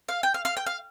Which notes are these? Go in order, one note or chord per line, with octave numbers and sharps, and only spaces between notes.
F5
G5
F5
F5
G5
F5